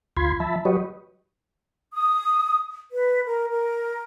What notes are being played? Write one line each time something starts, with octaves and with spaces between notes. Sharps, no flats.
D2 F4 B5 C6 G#6
F3 E5 A5 B5
F#3 F#4 G4 B4 C#5 D#5
D#6
B4
A#4
A#4